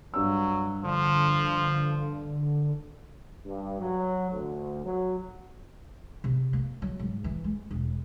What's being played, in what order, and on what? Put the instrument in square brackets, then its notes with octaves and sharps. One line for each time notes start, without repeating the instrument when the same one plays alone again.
[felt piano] G2 E6 [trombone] F#3
[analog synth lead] D3 [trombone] F3
[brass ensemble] G2
F#3
D2
F#3
[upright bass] C3
A#3
F#3
G#2
E3
G#3
E1